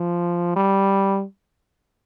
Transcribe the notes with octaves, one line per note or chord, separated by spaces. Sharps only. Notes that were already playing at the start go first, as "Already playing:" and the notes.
Already playing: F3
G3